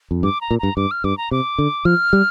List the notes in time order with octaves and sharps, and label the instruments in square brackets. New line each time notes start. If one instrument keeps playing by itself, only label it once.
[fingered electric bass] F2
[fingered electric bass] G2 [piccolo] D6
[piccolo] A#5
[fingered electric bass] A#2
[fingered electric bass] G2 [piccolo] A#5
[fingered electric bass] G2 [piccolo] D6
[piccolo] F6
[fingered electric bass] G2 [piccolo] D6
[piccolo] A#5
[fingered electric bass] C3 [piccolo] D6
[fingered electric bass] D3
[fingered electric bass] F3 [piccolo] F6
[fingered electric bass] G3